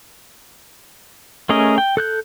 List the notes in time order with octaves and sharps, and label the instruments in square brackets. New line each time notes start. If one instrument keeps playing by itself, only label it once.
[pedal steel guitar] A3 C#4 G#4 A#4 D#5
G5
A4 F#6 G6